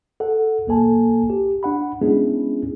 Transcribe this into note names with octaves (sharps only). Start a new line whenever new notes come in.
A4 F#5
B1 A#3 A4 G#5 A5
G4
D4 F#5 B5
G#3 B3 C#4 D4 E4 G#4